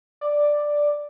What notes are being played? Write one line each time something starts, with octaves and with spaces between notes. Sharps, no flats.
D5